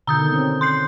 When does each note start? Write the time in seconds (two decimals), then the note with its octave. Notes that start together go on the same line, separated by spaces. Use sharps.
0.07 B2 D3 D#3 A#5 D#6 G6
0.33 C4 C#4
0.61 C6 G6 C7